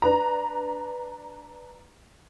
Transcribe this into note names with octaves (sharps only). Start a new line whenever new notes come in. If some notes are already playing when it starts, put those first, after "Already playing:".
D4 B4 A#5